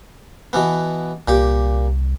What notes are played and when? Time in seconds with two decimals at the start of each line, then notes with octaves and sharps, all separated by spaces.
0.53 B2 E3 B3
1.28 C2 A#2 G4 D6